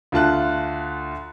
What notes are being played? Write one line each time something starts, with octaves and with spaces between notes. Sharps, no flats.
D2 F4 A5 F#6